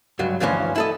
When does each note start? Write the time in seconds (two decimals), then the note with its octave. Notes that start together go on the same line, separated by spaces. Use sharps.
0.19 C#2 G2 F#3
0.40 D2 G2 E3 F3 C#4
0.76 E4 A4 D#5